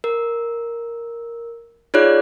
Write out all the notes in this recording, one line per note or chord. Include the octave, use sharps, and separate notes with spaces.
A#4
D#4 F4 G#4 C#5 D5 F#6